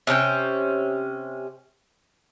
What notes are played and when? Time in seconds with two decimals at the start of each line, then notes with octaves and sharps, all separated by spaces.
0.07 C3 C#4 D#4 G5